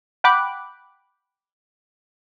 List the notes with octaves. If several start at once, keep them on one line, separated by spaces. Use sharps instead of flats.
F#5 G5 B5 D6 F#6